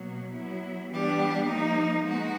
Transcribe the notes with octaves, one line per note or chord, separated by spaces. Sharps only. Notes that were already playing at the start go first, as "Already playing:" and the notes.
Already playing: B2 F#3 A#3
F#3 B3 E4
E3 G3 B3 D4 G4
F3 A#3 D#4
G#3 B3 D#4 F#4